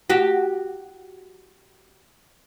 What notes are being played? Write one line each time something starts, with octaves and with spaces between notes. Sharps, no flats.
F#4 G4